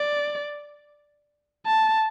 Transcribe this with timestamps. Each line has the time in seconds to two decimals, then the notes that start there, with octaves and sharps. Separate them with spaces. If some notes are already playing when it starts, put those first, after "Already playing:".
Already playing: D5
1.66 A5